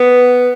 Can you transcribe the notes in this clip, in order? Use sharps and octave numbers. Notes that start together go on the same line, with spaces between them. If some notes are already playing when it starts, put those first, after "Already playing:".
Already playing: B3